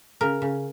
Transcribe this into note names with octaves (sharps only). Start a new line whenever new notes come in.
C#3 A#4
C#3